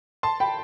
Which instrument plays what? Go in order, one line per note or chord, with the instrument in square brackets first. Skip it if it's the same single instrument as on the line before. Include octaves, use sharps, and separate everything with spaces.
[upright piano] A5 C6
G5 B5